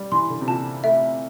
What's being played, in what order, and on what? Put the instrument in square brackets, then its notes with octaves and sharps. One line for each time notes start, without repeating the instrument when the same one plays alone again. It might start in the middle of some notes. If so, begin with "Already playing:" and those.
Already playing: [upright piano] G3
[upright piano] E3 [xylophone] C6
[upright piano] D3
C3
[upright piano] A#2 [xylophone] A5
[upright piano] A3 [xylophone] E5